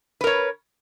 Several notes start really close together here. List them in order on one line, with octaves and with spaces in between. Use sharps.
B4 A#4 C#5